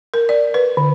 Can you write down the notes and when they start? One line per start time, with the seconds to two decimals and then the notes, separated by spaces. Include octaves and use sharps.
0.14 A#4
0.29 D5
0.54 B4
0.77 D3